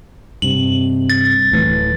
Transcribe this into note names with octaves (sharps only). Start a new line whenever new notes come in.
G2 C3 F#7
A6
D1 A2 E3